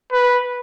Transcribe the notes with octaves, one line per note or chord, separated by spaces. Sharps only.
B4